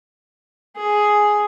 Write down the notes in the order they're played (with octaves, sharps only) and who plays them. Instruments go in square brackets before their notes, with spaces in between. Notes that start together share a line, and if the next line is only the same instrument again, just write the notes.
[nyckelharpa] G#4